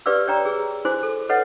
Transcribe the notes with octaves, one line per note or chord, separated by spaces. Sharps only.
G4 B4 D5 F5 D6 E6
C#5 D5 G5 A#5
G#4 E6
E4 F#4 C5 G#5 D6
A4
A4 B4 C#5 D#5 F#5